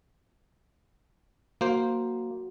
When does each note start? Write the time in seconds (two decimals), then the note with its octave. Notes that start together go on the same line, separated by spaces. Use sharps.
1.61 A#3 F#4 C5